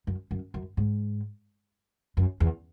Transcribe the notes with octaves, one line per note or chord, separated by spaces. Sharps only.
F#2
F#2
F#2
G#2
F#2
E2